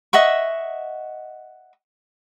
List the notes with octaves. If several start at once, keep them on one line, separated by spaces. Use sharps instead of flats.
D#5 E5 F#5 C#6